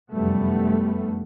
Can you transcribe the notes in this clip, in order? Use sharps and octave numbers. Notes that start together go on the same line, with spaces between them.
F1 F#2 G3 A3 B3